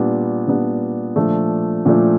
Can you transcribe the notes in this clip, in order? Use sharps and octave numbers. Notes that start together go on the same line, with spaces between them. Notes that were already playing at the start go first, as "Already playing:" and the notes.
Already playing: A#2 G3 B3 D4
A#2 G3 B3 D4
A#2 F3 A3 D4
A#2 F3 A3 D4